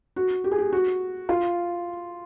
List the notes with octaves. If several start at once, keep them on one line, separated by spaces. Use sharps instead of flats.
F#4
G4
G#4
G4
F#4
F4